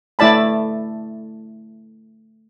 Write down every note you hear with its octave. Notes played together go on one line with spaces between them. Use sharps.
A3 E4 D5 A5 B5